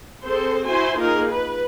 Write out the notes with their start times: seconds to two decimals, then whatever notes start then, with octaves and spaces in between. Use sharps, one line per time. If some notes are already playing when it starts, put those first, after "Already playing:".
0.25 C4 G#4 A4 C5
0.68 E4 F#4 C5 G#5 C6
0.97 A#3 D#4 F4 G#4 A#4
1.29 B4